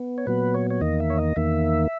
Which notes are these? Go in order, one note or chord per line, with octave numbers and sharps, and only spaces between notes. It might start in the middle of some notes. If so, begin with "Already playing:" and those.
Already playing: B3
C#5
A#2 F#3 B3 B4
C#5
C#5
E2 D#3 A#3 D#5
E5
C#5
D#5
E2 D#3 A#3 E5